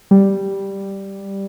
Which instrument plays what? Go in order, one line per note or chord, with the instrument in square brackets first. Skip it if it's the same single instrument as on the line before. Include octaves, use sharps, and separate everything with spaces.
[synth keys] G3